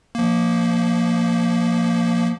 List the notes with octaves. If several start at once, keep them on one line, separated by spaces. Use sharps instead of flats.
F3 A#3